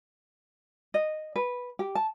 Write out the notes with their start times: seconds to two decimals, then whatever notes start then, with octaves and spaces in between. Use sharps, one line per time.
0.94 D#5
1.36 B4
1.79 G4
1.95 A5